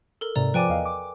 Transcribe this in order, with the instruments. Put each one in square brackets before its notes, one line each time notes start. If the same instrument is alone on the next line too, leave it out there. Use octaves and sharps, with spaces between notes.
[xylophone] A4 A#4
[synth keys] G#2 C3 [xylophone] D5 A#5
[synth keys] F3 D5 D6 [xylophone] B4 G5 G#5
[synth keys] E2 D#5 F5
D6